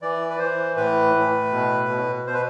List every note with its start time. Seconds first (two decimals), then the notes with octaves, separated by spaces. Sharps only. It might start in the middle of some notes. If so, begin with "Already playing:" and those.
0.02 E3 D5
0.30 B4
0.39 E3 C5
0.77 A2 B4
1.14 A2
1.52 B2
1.89 B2
2.26 B2 C5
2.34 B4